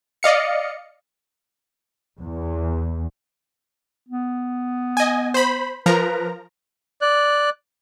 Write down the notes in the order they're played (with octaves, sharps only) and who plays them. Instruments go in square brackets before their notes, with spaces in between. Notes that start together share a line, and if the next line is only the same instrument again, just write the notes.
[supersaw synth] D5 D#5 F5 C#7
[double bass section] E2
[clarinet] B3
[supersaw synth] D#5 G#5
C5 B5
[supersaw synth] F3 A#4 A#5 [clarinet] B4
[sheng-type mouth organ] D5 F#6